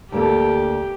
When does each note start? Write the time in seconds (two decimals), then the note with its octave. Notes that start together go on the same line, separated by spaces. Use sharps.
0.12 D2 A#3 G4 A4